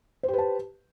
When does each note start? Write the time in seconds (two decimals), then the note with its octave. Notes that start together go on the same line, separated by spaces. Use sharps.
0.23 C5
0.28 G4
0.33 B4
0.38 A5